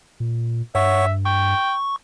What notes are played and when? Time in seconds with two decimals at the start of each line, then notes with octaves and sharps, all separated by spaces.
0.20 A#2
0.75 G2 C#5 E5 F#5 C#6
1.25 G5 C#6